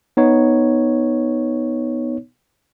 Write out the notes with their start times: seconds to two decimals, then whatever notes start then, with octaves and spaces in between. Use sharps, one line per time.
0.17 B3 D#4 C#5